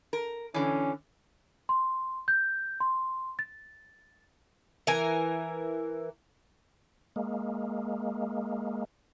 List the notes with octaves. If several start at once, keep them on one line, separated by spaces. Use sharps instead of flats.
A#4
D3 E3 C#4
C6
G6
C6
A6
E3 A#4 G#5
G#3 A#3